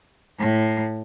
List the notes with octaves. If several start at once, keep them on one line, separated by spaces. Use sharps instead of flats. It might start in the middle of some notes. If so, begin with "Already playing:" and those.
A2